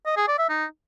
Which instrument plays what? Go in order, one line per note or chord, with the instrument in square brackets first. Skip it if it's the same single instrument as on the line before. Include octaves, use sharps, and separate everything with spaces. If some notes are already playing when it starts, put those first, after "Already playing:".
[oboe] D#5
G#4
D5
E5
D#4